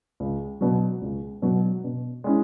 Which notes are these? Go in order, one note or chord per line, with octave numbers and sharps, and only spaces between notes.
C#2
B2 F#3
C#2
B2 F#3
B2
G#3 C#4 E4